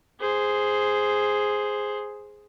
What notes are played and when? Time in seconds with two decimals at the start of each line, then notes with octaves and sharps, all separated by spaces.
0.20 G#4 C5